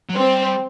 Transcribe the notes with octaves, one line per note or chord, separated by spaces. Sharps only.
F#3
G3 C4